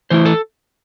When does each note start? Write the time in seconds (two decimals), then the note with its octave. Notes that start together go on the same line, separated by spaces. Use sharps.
0.10 E3 A3 E4 C5
0.26 A4